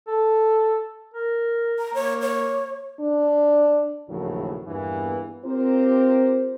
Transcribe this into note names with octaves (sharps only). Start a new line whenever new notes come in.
A4
A#4
A#5
A#3 C#5
C#5
D4
A#1 D#2 A2 C#3 E3 F#3
E2 G2 A#2 E3 B3 B4
C4 F4 G4 A#4 C5